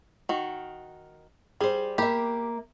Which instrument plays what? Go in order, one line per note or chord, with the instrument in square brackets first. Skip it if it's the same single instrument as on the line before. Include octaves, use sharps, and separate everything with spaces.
[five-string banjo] D#3 F#4
[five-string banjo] G3 [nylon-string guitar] G#4 C5
[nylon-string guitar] A#3 E5 [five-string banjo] G4 B5